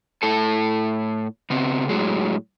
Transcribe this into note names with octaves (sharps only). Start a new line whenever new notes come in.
A2 A4 A5
C#3 B3 C4
A2 F#3 G#3